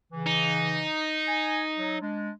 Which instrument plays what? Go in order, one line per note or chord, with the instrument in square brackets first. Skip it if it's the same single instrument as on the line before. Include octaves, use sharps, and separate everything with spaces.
[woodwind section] C#3 E3
[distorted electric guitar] D#4
[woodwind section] G#5
F#3
G#3 D4